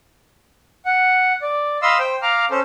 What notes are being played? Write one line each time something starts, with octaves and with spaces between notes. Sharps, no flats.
F#5
D5
D#5 F5 B5 C6 E6
C5 G5
F5 A#5 D6 F6
C#4 A4 C5